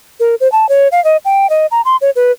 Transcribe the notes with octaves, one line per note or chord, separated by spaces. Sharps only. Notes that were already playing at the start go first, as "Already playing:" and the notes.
A#4
C5
A5
C#5
F5
D#5
G5
D#5
A#5
C6
C#5
B4